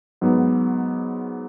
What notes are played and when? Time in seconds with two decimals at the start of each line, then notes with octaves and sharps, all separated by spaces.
0.21 G#2 F#3 B3